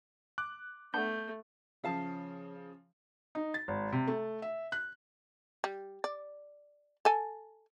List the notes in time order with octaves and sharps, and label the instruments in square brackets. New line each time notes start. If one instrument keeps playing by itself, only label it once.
[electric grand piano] D6 F#6
[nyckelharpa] A3 [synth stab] B3 D4 [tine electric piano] G6
[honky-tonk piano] C#3 F3 [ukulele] C#4 F5 A5
[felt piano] D#4
A6
G#1
C3
A3
E5
F#6
[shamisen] G3
D5
A4 G#5